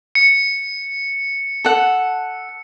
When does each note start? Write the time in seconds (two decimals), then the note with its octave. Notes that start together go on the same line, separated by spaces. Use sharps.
0.15 C#7
1.65 A4 F#5